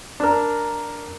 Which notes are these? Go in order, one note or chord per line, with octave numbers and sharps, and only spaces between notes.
D4 A#4